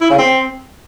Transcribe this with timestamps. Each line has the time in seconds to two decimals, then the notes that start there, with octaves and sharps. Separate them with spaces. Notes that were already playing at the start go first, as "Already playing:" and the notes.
0.01 E4
0.10 C#3
0.19 C4